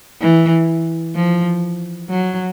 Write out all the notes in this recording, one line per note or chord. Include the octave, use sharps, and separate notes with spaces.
E3
F3
F#3